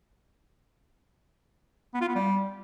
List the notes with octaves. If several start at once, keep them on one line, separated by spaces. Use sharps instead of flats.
B3
F4
B3
G3